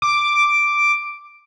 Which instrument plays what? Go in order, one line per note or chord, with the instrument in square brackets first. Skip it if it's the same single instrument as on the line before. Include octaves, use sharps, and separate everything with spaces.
[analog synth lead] D6